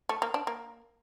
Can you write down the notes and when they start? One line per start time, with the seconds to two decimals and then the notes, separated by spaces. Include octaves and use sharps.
0.09 A3
0.22 A#3
0.34 D4
0.47 A#3